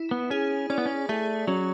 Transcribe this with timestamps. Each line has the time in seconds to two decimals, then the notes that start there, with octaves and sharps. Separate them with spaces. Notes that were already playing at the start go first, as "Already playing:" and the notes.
Already playing: E4
0.11 B3
0.30 C#4 G#4
0.70 C#4 D5
0.78 B3
0.86 C#4
1.09 A3 G#4
1.47 F#3 C#4